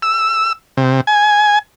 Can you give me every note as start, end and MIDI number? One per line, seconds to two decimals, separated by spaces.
0.02 0.53 88
0.77 1.01 48
1.07 1.59 80